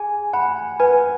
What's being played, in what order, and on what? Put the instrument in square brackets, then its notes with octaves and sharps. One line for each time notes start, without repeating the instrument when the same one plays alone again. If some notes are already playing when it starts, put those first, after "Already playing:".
Already playing: [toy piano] G#4 [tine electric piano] G#5
[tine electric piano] F#5 [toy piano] B5
[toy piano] B4 [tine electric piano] G#5